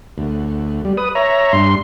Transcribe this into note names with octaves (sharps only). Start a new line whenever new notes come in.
D2
G3
B4 D#6
C#5 E5 A#5
G2 C6